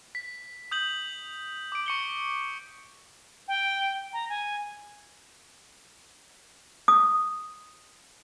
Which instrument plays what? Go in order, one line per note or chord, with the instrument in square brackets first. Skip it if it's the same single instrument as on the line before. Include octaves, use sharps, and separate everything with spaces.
[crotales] B6
D#6 G6 F#7
D6 D7
C#6 C#7 G7
[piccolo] G5
A#5
G#5
[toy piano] D#6